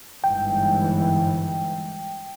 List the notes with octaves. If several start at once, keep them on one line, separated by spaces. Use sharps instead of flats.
G1 G#2 E3 G5